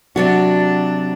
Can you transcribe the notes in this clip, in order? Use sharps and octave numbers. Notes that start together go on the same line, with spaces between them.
C3 F#3 D4 F#4